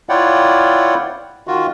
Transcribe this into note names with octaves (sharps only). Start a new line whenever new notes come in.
E4 F4 C#5 D5 F#5 G5
D#3 F4 F#4